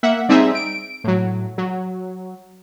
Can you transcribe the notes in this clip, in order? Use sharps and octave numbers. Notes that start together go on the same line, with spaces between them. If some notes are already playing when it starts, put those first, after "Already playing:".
A#3 E5 F#5
G3 C4 D#4 G#4 E5
D7
A2 F#3
F#3